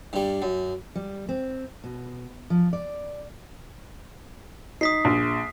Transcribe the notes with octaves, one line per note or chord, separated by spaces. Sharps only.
G2 G3
F#2
G3
C4
B2
F3
D5
D#4 D#6 B6 C7
A#1